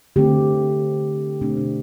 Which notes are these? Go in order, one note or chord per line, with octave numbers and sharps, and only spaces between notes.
D3 A3 C4 G4
B2 A3 C4 D4
D4